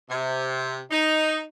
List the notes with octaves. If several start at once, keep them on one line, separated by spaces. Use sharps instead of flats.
C3
D#4